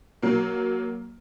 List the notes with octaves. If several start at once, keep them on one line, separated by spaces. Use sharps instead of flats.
F#3 A#3